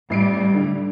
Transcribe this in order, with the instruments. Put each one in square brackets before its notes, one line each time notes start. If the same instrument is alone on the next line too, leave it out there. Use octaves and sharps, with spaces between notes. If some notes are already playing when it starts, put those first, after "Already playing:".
[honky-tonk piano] A1 C7 D7 [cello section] G3
[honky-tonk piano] D3